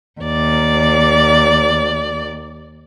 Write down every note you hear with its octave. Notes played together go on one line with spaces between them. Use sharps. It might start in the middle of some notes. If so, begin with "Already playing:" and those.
D#2 D5